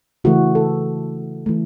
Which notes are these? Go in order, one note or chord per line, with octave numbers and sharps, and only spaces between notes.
C#3 E3 A3 F#4
A4
E3 A3